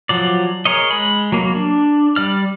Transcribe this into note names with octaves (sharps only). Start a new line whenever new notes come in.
F3 F#3 D5
G#4 A#4 C#5 D#5
G#3 B5
F#3 A#3
D4
G3 D5 F6